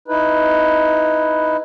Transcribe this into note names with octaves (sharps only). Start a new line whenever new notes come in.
D#4 E4 B4